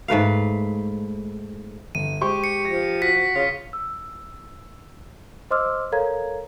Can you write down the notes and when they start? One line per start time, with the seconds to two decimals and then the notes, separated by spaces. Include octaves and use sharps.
0.08 G#2 A3 B4 F5
1.95 G1 D#7
2.21 G#3 G4 C5 C#6
2.44 C#7
2.65 F3 A#6
3.02 F#4 A#6 B6
3.35 C#3 F4
3.73 E6
5.51 C5 D#5 C6 D6 E6 F6
5.92 A4 A#4 C#5 F5 A#5 G#6